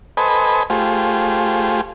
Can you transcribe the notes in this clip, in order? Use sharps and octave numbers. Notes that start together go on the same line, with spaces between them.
A4 B4 C5 D#5 G#5 B5
A3 F4 G4 G#4 C5